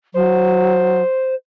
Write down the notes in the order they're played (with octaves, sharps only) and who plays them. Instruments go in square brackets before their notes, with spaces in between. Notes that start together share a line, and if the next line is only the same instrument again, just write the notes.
[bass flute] F#3 [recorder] C5